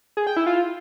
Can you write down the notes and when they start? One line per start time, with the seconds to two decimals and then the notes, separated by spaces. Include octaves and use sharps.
0.17 G#4
0.27 G5
0.37 E4
0.46 F4